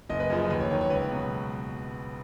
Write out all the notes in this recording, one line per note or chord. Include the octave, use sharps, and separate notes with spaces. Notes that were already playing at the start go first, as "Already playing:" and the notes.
F#1 D#5
B4
F#2 F3 G#4
D#2 B4
C#5
D#3 F#3 C#5
C#5
C#2 B4
B2 F#3